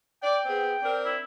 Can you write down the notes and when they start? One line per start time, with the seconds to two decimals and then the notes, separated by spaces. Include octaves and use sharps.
0.23 D5 G5
0.45 B3 C4 G#4
0.82 C4 D4 A#4
1.05 E4